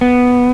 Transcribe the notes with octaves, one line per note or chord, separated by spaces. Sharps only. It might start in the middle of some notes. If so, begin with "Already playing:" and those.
B3